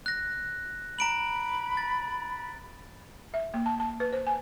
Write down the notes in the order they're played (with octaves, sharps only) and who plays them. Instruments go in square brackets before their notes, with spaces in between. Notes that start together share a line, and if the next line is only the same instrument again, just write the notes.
[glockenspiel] F#6 A#6
[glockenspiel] A#5 D7 F#7 [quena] B5
[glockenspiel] A6
[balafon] E5
A#3
A5
A5
B4
C5
G#5